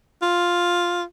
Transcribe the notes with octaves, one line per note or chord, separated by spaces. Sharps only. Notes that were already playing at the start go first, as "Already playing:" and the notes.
F4